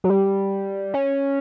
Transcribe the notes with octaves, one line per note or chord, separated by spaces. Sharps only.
F#3
G3
C#4